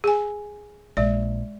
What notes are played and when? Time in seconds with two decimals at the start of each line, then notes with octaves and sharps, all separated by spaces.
0.04 G#4 G#5
0.97 A#1 G#3 D5